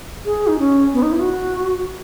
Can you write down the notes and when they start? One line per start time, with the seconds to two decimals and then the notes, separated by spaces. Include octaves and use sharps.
0.25 G#4
0.47 D#4
0.59 C#4
0.93 B3
1.02 D#4
1.11 E4
1.20 F#4